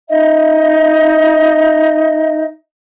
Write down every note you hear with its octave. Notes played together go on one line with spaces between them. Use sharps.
D#4 D#5 E5